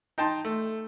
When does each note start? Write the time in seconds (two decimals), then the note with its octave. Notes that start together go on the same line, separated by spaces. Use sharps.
0.18 D#4 G5 A5 C6
0.45 A3